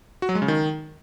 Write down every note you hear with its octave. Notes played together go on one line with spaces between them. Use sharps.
F#4
F#3
G#3
C#3
D#3